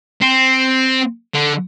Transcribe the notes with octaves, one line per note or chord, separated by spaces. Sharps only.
C4
D3